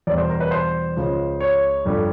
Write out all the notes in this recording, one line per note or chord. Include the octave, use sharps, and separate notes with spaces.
E2 B2 G3 D5
C5
A#4
B4
C5
C#2 C#3 F3
C#5
G1 F2 D3 G3